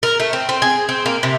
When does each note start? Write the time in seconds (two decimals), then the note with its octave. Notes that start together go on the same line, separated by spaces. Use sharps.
0.03 A#4
0.20 A3
0.33 C4
0.49 C4
0.62 G#4
0.89 C4
1.06 A#3
1.23 C3